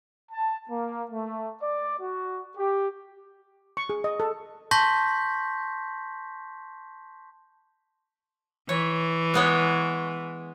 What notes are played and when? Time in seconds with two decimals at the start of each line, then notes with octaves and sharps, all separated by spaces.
0.32 A5
0.69 A#3
1.12 A3
1.61 D5
2.00 F#4
2.58 G4
3.77 C#6
3.89 G#4
4.04 D#5
4.20 A4
4.71 A5 C6 C#6 G6 A#6 B6
8.69 E3 C#5
9.34 G#3 B3 C#5